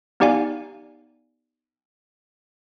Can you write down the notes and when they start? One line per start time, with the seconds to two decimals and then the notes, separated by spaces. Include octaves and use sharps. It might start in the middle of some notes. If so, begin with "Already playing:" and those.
0.20 B3 D#4 G4 D5 F5 G#5